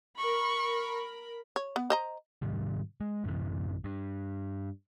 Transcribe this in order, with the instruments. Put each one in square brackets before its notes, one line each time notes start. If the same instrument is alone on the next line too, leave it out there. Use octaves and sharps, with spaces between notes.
[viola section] A#4 B5 [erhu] C#6
[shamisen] C#5
B3
C5 D#5 A#5
[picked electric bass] G#2 C3 D#3 G3
G#3
A1 F#2 C3 E3
G2